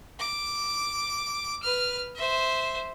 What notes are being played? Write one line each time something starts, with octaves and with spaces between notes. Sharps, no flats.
D6
B4 F6
C5 E5